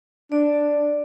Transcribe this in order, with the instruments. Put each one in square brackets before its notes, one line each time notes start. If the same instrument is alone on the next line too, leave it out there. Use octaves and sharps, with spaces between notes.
[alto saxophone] D4 [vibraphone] D5